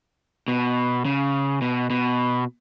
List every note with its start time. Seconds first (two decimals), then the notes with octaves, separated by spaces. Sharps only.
0.48 B2
1.05 C#3
1.61 B2
1.90 B2